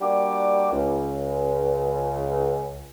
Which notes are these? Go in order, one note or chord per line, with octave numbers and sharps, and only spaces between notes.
G3 A#3 D4 F#4 G4 D6
C#2